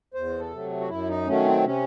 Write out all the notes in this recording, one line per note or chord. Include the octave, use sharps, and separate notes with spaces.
E2 C5
A4
C3 F#3 A3
F#4
F#2 E4
D#4
D#3 F#3 A3 C#4
C4
C3 C#4